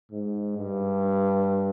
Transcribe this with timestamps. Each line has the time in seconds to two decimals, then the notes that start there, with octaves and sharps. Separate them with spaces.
0.11 G#2
0.57 G2